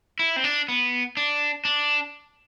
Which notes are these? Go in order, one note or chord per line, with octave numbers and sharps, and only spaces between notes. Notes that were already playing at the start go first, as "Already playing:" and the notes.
E4
C4
D4
B3
D4
D4